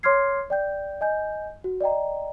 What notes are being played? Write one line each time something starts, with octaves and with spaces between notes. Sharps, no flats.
C#5 C6 D6 F6 G#6 C7
D5 G5 G6
D#5 G#5 G6
F#4
D5 D#5 G5 A#5